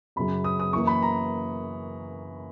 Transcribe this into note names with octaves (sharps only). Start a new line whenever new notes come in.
F#2 C#3 F#3 B5
D#6
D#6
F#2 E3 A#3 C#6
B5
A#5